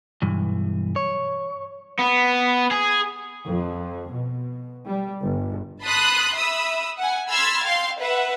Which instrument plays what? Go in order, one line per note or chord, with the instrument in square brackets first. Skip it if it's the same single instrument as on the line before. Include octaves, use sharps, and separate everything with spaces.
[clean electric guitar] B1 G2 E3
C#5
[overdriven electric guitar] B3
G#4
[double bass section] F2
B2
G3
G1
[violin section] A5 B5 C6 D#6 F#6
E5 B5 D#6 E6
F#5 G#5
B5 C6 E6 F6 G#6 A6
F5 G5 C6
B4 E5 F#5